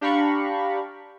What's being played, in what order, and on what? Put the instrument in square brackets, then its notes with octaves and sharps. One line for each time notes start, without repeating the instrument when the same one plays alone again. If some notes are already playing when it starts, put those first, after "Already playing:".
[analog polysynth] D4 G4 F5 A#5 B5 C#6